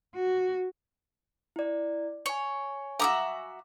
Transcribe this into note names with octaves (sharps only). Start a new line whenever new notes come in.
F#4
E4 D5
C#5 G#5 C#6
F#4 E5 F5 A#5 D6 D#6